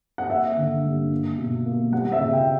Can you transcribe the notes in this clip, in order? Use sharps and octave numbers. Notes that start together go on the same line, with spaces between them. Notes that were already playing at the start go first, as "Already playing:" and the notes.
F#5
A#3 E5
D3
G2
A#3
B2
A#3
G3 F#5
E5
C#3
G5